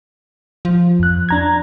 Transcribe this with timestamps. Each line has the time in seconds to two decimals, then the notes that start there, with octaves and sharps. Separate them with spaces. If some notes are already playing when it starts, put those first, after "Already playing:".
0.65 F3
0.99 F2 F#6
1.29 D4 A#5 G#6